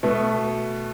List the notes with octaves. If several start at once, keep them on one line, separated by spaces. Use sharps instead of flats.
B2 A3 B3